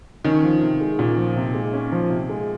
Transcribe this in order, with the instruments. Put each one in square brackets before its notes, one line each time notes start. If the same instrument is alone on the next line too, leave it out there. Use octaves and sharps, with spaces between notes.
[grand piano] D#3 [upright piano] C#4
[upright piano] F3
C3
G#3
[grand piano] A#2 [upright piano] C#4
[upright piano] F3
C3
G#3
C#4
F3
C3
G#3